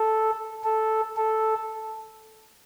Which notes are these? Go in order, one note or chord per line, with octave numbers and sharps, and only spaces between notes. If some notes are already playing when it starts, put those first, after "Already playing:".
Already playing: A4
A4
A4